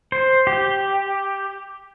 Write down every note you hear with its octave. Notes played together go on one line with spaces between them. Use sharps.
C5
G4